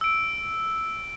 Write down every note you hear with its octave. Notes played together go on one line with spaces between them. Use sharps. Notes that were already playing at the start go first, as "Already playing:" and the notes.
E6 D7